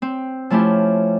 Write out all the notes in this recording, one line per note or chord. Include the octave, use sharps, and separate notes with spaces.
C4
F3 A3 C#4 E4 G4